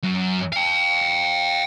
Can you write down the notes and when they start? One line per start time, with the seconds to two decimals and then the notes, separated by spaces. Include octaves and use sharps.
0.03 F#2
0.53 F5 G5